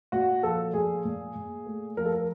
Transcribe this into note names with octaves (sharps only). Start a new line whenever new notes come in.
A#2 F#4
F3 A4
A#2 G#4
A#2
A#2
A3
F3 A#4
A4
A#4